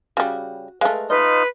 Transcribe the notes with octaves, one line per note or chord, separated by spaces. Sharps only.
C#3 G3 F#4
G#3 A3 A#4 B4 F5
D#4 F4 B4 D#5